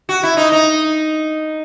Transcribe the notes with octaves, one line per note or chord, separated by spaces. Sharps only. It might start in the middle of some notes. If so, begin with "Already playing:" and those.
F#4
E4
D#4
D#4